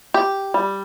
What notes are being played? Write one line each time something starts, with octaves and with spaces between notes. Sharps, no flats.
G4
G3